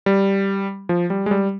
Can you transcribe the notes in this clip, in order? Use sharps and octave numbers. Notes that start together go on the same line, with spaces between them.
G3
F3
G3
G#3
G3